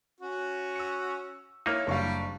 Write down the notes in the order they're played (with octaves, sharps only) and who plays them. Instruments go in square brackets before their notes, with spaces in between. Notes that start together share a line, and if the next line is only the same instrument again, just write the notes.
[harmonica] C#4 F#4
[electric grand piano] E6 C#7
[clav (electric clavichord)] A#3 D#4 [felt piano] E4 [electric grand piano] C#5 E5 F5
[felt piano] F#1 F5 [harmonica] G3 [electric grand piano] D4 C#6